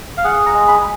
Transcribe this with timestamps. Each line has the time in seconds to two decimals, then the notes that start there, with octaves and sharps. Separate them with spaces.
0.17 F5
0.24 G#4 F#5
0.46 A#5
0.54 G#3
0.68 B5